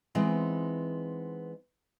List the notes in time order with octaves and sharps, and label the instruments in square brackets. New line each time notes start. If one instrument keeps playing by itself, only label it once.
[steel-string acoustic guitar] E3 G#3 B3 C4 D#4